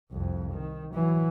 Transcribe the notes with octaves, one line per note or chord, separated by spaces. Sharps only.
C2 F2
D#3
E3 F#3